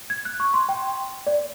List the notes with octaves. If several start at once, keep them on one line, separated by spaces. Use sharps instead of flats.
G#6
F#6
C#6
C6
G5
D5